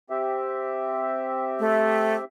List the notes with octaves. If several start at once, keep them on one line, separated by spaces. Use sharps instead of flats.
C4 G4 E5
A3